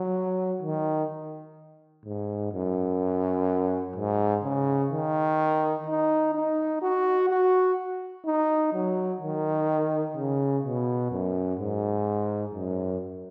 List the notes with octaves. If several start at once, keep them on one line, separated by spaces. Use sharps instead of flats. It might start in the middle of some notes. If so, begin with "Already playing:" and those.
Already playing: F#3
D#3
G#2
F#2
G#2
C#3
D#3
D#4
D#4
F#4
F#4
D#4
F#3
D#3
C#3
B2
F#2
G#2
F#2